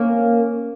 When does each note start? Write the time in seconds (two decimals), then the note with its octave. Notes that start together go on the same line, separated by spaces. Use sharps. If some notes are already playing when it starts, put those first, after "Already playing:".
Already playing: A#3 C#4